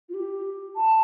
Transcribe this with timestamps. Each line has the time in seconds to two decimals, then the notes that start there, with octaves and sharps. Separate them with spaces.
0.09 F4
0.14 G4
0.76 A5